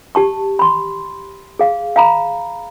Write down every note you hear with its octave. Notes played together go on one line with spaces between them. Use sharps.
G4 A5 C#6
B5 C6
G#4 F5
F5 A#5 B5